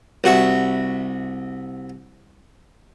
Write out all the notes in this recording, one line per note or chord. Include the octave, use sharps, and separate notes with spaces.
C2 F#4 E5